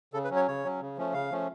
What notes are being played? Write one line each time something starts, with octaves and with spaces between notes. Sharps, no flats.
C#3 A4
B4
F#3 C#4
C#5
C#3 C#5
F#3 C#4
C#3
F3 A3 C#4
C#3 F5
F3 A3 C#4